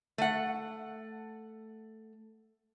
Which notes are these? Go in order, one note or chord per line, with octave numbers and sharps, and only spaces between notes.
A3 F#5